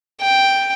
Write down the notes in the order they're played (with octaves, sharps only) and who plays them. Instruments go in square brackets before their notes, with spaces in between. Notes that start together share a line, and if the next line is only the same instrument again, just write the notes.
[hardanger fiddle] G5